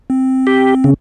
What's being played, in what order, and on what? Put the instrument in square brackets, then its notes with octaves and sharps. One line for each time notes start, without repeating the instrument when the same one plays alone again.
[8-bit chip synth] C4
[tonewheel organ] G4
C#3